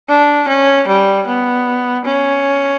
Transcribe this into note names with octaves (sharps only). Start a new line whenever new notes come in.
D4
C#4
G3
B3
C#4